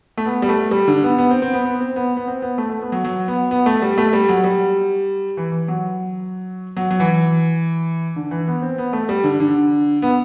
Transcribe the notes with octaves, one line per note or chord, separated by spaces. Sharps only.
A3
B3
G3
A3
G3
D3
B3
B3
C4
C4
B3
B3
C4
B3
B3
C4
B3
A3
A3
B3
F#3
F#3
B3
B3
A3
G3
A3
G3
F#3
G3
E3
E3
F#3
F#3
F#3
E3
D3
E3
B3
C4
B3
A3
G3
D3
D3
B3